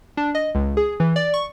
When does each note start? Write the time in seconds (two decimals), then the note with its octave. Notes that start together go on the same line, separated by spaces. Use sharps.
0.17 D4
0.35 D#5
0.55 C#2
0.77 G#4
1.00 E3
1.16 D5
1.34 C#6